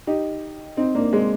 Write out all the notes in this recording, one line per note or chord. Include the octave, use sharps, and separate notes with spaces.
D#4 G4
C4 D#4
A#3 D4
G#3 C4